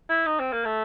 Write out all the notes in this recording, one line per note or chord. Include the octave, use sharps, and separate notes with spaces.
E4
D#4
C4
A#3
A3